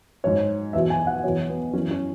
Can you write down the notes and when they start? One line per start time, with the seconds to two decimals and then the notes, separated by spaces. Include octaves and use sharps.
0.23 G#2 F#3 C#5
0.73 E2 B2 F#3 E5
0.90 G#5
1.07 F#5
1.24 E2 B2 F#3 C#5
1.49 B3
1.73 F#2 E3 C#4
1.91 C#4